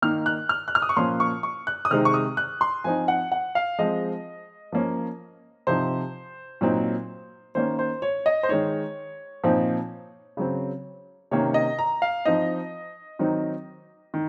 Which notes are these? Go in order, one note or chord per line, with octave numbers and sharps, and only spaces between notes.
D#3 A#3 D#4 F6
F#6
F6
F#6
F6
D#6
C#6
A#2 F3 A#3 C#4 C6
C#6
C#6
F#6
D#6
C3 D#3 G#3 C4 D#4 F6
C#6
D#6
F#6
C6
F3 C4 D#4 G#5
F#5
F#5
F5
F3 G#3 C4 D#5
F3 A#3 C#4
C3 F3 C4 D#4 C5
A#2 F#3 C4 D#4
D#3 A#3 C#4 C5
C5
C#5
D#5
C5
D#3 G#3 D#4 C#5
A#2 F3 C4 D#4
C#3 F#3 C4
C3 D#3 A#3 C#4 C#5
D#5
A#5
F5
F3 C4 D#4 D#5
D#3 F#3 C4 D#4
D#3